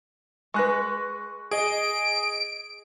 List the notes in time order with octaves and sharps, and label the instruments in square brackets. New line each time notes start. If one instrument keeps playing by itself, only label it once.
[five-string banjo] G#3 B4 [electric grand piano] C#6 F#6 A#6
[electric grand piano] G#4 D#5 [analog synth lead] D7